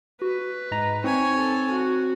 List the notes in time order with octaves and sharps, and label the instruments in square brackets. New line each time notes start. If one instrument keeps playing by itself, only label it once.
[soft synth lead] F#4 [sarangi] B4
[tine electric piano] G#2 A#5 [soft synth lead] D#5
[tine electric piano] C4 [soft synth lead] D#4 [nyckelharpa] C#5 G#5
[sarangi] A4
F#4